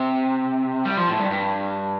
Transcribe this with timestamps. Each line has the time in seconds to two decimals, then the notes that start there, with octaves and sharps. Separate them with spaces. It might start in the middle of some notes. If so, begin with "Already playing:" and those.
Already playing: C3
0.85 G3
0.97 F3
1.08 A2
1.19 G2
1.31 G2